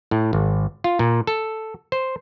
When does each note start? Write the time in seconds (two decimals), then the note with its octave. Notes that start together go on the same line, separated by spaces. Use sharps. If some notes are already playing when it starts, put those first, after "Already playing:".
0.11 A2
0.33 G#1
0.84 F4
0.99 A#2
1.27 A4
1.92 C5